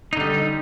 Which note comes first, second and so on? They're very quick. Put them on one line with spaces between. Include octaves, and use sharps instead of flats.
D#4 D3 G3